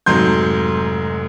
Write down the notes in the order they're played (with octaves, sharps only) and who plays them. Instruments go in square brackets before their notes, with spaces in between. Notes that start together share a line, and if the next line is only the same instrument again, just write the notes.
[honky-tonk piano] F1 G#2 F#3 C6 G6